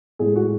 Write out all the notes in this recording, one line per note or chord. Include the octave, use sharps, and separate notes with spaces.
A2 G#3 G#4
F#4